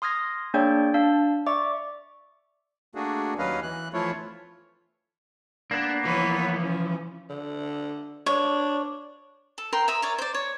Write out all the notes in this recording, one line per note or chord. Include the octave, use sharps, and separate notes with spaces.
C6 D#6 F6 G#6 A#6
A#3 D4 G#4 C#5 D5 G5
D4 F5 A5
D5 E5 C#6 D6
A3 A#3 D4 F#4 G#4
D#2 F#3 C#4 B4 D#5 F5
E3 F#6
E3 F3 A3 E4 F4 C#5
A#3 B3 D4
E3 F3 B4 C#5
C#4
D3
D4 C#5
A4
A#4 G5 C6
E5 A#5 D#6
A#4 C#5 D5
C5 D5
C#5